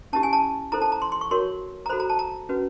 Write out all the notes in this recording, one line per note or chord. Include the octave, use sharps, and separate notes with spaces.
C#4 E4 G4 A5
G#5
A5
E4 A4 C5 A#5
A5
A#5
C6
C6
C#6
F#4 A#4 C#5 C6
A#5
F#4 A4 C5 B5
A#5
A5
A#5
C#4 F#4 B4